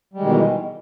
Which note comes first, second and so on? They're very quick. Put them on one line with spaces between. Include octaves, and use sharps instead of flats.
G3 G#3 D#3 B2 E3